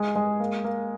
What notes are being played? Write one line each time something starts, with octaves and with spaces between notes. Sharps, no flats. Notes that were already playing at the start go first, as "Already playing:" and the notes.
Already playing: G#3 G#4
G#3
A#3
A#3